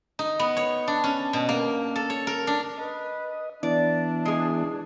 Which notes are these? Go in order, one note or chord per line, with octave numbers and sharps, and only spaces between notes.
D#4
B3
C#5
D4
C#4
B2
A#3
A4
C#5
A#4
D4
B4 D#5
E3 B3 D4 E4 D5
G#3 G#4